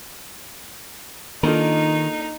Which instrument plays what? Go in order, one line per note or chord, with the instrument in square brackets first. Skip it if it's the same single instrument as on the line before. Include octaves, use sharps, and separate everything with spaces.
[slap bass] D#3 [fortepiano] A#3 D4 F4 [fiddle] D#4 [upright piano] A4 D#5 A#5